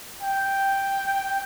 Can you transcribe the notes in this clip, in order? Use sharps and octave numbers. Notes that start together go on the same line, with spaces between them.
G5